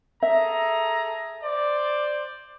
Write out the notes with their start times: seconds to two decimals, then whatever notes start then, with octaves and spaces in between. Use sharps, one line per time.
0.23 G#4 A4 E5 A#5
1.43 C5 D5